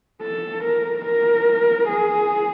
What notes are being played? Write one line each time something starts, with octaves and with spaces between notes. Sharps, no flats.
A4
A#4
A#4
G#4